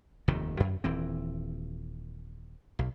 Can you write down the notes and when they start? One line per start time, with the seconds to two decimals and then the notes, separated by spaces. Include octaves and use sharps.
0.28 F1 D#2 C3 D#3
0.60 F#2
0.84 D#1 E3 C4
2.79 B1